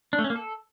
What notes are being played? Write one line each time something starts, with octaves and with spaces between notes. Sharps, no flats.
D4
A3
C#4
A#3
A4